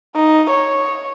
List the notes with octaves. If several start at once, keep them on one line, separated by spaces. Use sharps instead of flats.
D#4
C#5